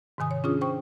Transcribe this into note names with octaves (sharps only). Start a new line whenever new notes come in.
G#2 C3 D#3 G#5 D#6
C#5
C#4 D4 F4 G#4 D#6
C5 G5 C#6